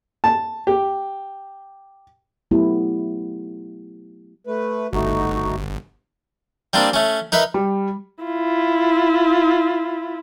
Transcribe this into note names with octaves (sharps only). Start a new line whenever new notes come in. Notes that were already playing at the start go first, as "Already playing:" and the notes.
A5
G4
F#3 A3 B3 E4 G4
A3 B4
G1 A3 D#4 F#4
G3 A#3 C4 D4
A3 C#4
D#4 A#4 B4 E5
G3
E4 F4